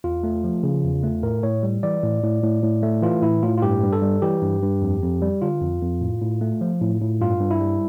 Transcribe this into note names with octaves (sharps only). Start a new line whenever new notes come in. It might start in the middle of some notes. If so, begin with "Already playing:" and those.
E2 F4
A3
F3
C#3
E2
A3
A2 A#4
A2 C#5
G3
E3 D5
A2
A2
A2
A2
A3
E3 F4
A2 E4
A2 F4
F4
G2 G4
G2
A4
G3
E3 G4
G2
G2
F2
F2
G3
D3 F4
F2
F2
A2
A2
A3
F3
A2
A2
G2 F4
G2
E4
G3